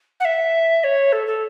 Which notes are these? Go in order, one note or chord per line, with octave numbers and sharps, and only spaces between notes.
F#5
E5
C#5
A4
A4